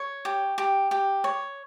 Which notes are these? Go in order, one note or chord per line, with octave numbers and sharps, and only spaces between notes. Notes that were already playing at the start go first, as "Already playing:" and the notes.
Already playing: C#5
G4
G4
G4
C#5